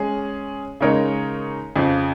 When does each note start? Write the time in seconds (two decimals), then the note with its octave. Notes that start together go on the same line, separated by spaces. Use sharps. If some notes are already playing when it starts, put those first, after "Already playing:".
Already playing: G#3 C#4 G#4
0.81 C#3 G#3 D#4 A#4 C#5
1.76 F2 C#3 F3